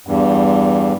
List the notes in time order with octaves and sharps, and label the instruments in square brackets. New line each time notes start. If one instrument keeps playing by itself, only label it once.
[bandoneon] E2 G2